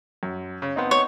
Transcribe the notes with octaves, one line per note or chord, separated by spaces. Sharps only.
F#2
C#3
B3 C4 D#4
C#5